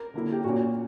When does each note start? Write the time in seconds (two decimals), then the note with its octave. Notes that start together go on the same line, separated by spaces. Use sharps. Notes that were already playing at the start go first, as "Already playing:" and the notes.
Already playing: A#4
0.14 D3 A#3 E4
0.32 G4
0.44 A#2 A#3 C#4 F#4